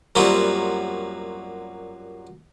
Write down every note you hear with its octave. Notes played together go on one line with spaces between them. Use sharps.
F#2 A#2 F#3 G3 B3 C4